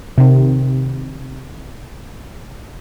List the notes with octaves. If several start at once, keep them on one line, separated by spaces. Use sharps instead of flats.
C3 D#3